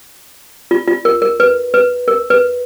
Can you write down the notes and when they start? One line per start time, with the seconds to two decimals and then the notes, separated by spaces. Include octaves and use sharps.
0.71 F4
0.87 F4
1.05 A#4
1.22 A#4
1.40 B4
1.74 B4
2.08 A#4
2.30 B4